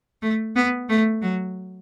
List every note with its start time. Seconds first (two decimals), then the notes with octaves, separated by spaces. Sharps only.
0.22 A3
0.55 B3
0.89 A3
1.22 F#3